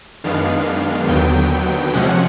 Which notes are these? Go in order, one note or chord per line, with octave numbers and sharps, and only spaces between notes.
F#2 D#3 G#3 B3 D4 F5
D#2 D3 F#3 B3 G5
C3 F3 G#3 C#4 F#5